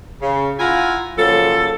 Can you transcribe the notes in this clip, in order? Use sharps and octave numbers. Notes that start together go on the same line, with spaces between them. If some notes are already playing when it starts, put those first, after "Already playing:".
C#3
E4 F4 F5 F#5 G#5 A#5
C#3 F3 F#3 A#3 A4